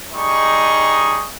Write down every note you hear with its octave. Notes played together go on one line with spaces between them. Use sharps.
G3 D#4 G#4 D#5 C#6